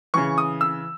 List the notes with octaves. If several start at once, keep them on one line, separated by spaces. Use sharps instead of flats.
C#3 E3 C#6
D#6
E6